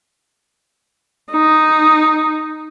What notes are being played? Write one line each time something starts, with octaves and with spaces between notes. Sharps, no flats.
D#4